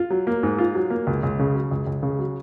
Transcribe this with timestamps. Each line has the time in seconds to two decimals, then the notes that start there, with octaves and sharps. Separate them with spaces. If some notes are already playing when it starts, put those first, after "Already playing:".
Already playing: F4
0.10 F#3
0.27 A#3
0.43 G#2
0.58 F4
0.75 F#3
0.90 A#3
1.07 C#2
1.23 C#2
1.39 C#3
1.54 F#3
1.71 C#2
1.87 C#2
2.03 C#3
2.19 F#3